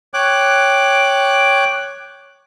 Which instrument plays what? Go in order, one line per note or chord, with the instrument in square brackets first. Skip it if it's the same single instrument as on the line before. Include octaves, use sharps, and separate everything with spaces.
[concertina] C#5 G5 D6 F#6